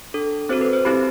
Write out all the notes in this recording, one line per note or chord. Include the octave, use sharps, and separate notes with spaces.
D4 A4
C4 F#4 A4 C5
B4
C5
C4 E4 G4 B5